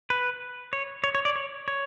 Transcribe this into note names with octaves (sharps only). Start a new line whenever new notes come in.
B4
C#5
C#5
C#5
D5
C#5
C#5